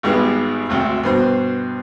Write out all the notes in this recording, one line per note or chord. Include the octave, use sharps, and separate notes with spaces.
G#1 G#2 G3 G#3 B3 G4
G#1 D2 C3
G2 B2 C5